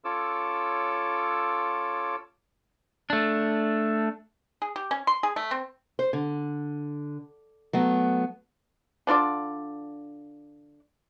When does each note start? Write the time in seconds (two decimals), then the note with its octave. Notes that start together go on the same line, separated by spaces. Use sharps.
0.05 C#4 F4 A4 C#5 D6 E6
3.10 A3 D4
4.62 G#4
4.76 G4
4.91 C#4
5.07 C6
5.23 G#4
5.36 A3
5.51 C4
5.99 C5
6.13 D3
7.73 F#3 A3 B3
9.07 D3 D4 F4 D5